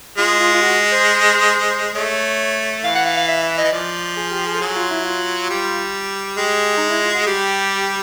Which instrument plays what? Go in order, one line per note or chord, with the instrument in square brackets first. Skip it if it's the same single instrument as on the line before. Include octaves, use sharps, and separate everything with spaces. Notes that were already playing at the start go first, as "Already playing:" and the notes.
[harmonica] G#3 [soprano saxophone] F4
[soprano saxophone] F4
F4
F#4
C5
[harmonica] A3 [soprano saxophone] C#5
[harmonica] E3 [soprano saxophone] F5
[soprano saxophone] F#5
F5
F5
E5
E5
D#5
[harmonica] E3
[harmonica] F3 [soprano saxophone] D5
[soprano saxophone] G#4
G4
G#4
A4
[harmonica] F#3 [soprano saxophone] G#4
[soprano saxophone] F4
E4
F4
[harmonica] G3
[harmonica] G#3 [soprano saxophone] G4
[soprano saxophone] D#4
E4
F4
F#4
[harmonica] G3 [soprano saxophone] G4